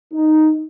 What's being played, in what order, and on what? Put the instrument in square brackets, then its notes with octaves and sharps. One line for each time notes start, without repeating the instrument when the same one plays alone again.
[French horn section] D#4